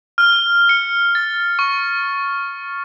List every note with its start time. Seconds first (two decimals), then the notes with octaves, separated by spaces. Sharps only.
0.18 F6
0.69 C#7
1.15 A6
1.59 C#6